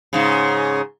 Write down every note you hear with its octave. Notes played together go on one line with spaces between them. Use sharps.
G#2 C#3